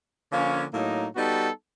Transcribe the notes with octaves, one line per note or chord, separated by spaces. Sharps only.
D3 F3 A#3 C#4
A2 F#3 A#3 D#4
G3 B3 D#4 F#4 A4